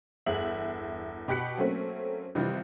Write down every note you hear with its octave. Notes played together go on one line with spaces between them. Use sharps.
G1 E2 G#4 E5 F#7
B2 G4 B5 F#6 B6 C#7
F#3 A3 A#3 C4 C#4
C3 D#3 E3 G3 D#4 F4